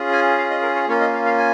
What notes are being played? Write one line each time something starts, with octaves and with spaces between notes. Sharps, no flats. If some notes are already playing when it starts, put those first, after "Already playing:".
Already playing: C#4 F4 G#4
G#5
F5
D#5
A#4
C#5
A#3 C#4 F4 C#5
D#5
F5
F5
G#5